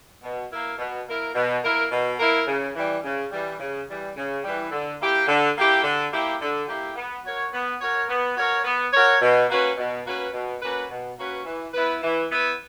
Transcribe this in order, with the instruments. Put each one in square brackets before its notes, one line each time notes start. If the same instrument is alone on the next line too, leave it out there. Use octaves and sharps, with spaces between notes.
[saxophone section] B2
A#3 E4 A#4
B2
A#3 E4 A#4
B2
A#3 E4 A#4
B2
A#3 E4 A#4
C#3
E3 G3
C#3
E3 G3
C#3
E3 G3
C#3
E3 G3
D3
A#3 E4 G4
D3
A#3 E4 G4
D3
A#3 E4 G4
D3
A#3 E4 G4
B3
F#4 A#4 C#5
B3
F#4 A#4 C#5
B3
F#4 A#4 C#5
B3
F#4 A#4 C#5
B2
A#3 C#4 F#4 B4
B2
A#3 C#4 F#4 B4
B2
A#3 C#4 F#4 B4
B2
A#3 C#4 F#4 B4
E3
B3 E4 B4
E3
B3 E4 B4